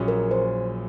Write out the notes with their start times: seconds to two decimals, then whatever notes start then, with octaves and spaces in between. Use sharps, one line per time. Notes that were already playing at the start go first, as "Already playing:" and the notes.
Already playing: A#1 A#2 F#3 C#4 G#4
0.08 A#4
0.31 C5